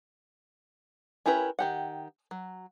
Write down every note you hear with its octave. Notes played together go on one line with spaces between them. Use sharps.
C#4 E4 G4 A#4 B4
D#3 G4 F#5
F#3